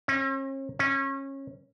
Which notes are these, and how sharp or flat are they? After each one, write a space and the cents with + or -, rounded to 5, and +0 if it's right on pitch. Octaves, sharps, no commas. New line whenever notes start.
C#4 -45
C#4 -25